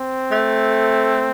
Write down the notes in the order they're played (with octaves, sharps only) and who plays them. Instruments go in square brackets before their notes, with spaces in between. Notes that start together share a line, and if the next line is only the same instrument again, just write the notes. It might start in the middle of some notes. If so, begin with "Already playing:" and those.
Already playing: [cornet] C4
[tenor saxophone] A3